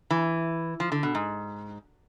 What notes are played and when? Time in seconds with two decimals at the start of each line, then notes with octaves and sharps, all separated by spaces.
0.10 E3
0.80 F3
0.92 D3
1.03 B2
1.15 G#2